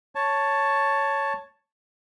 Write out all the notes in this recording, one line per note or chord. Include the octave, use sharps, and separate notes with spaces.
C#5 A5